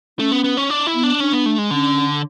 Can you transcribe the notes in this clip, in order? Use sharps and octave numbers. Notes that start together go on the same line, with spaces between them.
A3 C#4
B3
B3
C#4
D4
E4
B3
D4
C#4 D4
B3
A3
G#3
D3 C#4